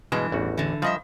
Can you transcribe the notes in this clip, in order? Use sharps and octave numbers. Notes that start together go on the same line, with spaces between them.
G2 B2 E3 G#3
A1 E2 F#4
D3 E3
F3 G3 D#5 E5